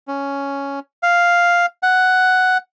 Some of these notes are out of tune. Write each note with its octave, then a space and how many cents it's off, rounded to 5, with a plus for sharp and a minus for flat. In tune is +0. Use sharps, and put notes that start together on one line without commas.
C#4 +5
F5 +0
F#5 +5